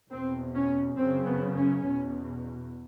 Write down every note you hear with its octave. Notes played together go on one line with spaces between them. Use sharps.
E2 B2 C4
C#4
F#2 C#3 C4
B3
C#4
E2 B2